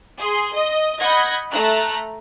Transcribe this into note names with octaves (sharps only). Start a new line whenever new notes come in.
G#4 C6
D#5
D#5 F#5 B5 G6 G#6 A#6
A3 A#5 F#6